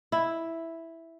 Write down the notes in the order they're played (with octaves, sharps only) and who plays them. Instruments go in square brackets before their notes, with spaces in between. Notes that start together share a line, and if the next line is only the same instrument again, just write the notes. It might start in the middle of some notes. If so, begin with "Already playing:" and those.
[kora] E4